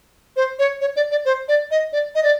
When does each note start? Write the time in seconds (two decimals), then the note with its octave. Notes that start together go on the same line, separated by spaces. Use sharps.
0.36 C5
0.59 C#5
0.81 C#5
0.96 D5
1.11 D5
1.25 C5
1.48 D5
1.71 D#5
1.93 D5
2.15 D#5
2.24 D5